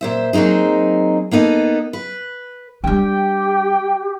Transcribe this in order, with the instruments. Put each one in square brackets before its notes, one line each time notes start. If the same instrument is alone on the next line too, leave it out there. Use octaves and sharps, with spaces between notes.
[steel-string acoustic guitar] A#2 C5 E5
F#3 A#3 C4 D#4 G#4
A#3 B3 D#4 A4
B4
[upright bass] G3 D4 [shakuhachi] G4 [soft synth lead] G5